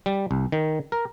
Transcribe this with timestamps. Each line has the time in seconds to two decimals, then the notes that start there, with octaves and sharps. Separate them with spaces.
0.06 G3
0.31 C2
0.52 D#3
0.92 A#4